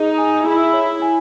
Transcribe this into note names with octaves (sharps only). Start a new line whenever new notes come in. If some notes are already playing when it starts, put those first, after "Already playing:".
Already playing: D#4 G#4
G#5
E4 G#4
C#5
G#5